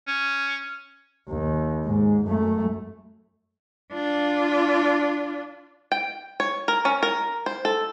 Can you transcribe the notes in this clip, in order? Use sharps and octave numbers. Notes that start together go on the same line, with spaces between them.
C#4
D#2
G#2
F#2 A3
D4 F4
G5
C#5
A#4
C#4
A#4
C5
A4